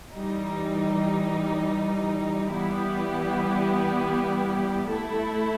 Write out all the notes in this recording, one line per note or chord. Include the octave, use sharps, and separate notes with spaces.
E3 G3 D#4
E3 G3 B3 E4 G4
A3 E4 A4